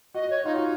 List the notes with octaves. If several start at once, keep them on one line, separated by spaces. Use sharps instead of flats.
F#4 D#5
C#5
D#4 F4
F#4